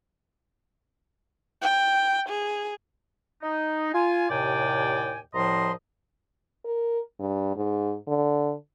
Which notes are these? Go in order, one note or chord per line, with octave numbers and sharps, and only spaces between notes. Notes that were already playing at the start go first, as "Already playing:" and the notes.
G5
G#4
D#4
F4 G#5
D#2 A2 C3 D5 G5 G#5
C2 A2 F3 D#5 A#5 C6
A#4
G2
G#2
D3